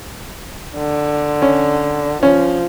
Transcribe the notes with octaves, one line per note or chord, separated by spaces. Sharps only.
D3
C#4
F3 C#4